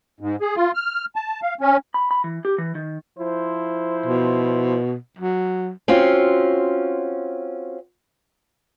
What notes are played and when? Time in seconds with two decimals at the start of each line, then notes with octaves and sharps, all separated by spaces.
0.20 G#2
0.41 G#4
0.56 F4
0.75 F6
1.16 A5
1.42 F5
1.61 C#4
1.94 B5
2.11 B5
2.24 E3
2.45 G4
2.58 E3
2.75 D#3
3.18 F3 E4 C5
4.06 B2
5.18 F#3
5.88 C4 C#4 F4 F#4